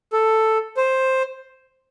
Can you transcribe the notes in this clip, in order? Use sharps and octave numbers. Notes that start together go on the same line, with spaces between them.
A4
C5